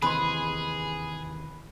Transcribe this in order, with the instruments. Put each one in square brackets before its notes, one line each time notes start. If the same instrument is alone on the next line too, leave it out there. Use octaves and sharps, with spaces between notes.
[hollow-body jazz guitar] D#2 C3 E3 [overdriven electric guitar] G#4 [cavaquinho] B4 [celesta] B5 C6